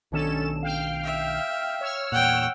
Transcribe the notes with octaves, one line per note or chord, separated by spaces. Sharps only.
B1 D#3 C#4 D4 A4 E7
F5 G5 F6
E5
C#5 E6 F6
E2 A#2 F#5 G5